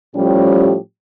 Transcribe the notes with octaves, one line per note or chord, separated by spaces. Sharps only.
A2 F3 G3 C#4 G4